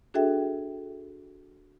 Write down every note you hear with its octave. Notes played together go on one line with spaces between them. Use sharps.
D4 F#4 G#4 A4 E5 G5